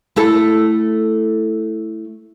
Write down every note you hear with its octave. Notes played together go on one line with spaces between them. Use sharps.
A3 E4 A4